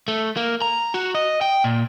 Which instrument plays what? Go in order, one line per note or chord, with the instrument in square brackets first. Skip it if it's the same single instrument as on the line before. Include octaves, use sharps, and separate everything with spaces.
[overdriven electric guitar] A3
A#3
A#5
F#4
D#5
G5
A#2